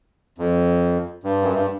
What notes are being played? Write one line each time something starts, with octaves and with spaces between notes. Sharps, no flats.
F2
G2
F#2
G2